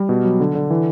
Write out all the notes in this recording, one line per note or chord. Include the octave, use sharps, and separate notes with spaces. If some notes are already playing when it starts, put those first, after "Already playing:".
Already playing: G3
B2
F#3
D3
D3
E3